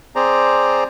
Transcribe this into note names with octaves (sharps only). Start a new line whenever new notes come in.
C4 G#4 C5 D5 A#5